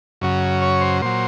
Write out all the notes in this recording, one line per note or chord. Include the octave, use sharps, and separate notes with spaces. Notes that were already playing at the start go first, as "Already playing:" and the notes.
F#2 C#3 F#3
C#5
C5
A#2 F#3 C5